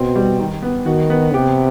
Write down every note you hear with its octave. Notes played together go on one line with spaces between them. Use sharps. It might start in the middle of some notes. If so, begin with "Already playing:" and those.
Already playing: B2 C4
G3
D#3
B3
D#3 F#4
B3
C3 G4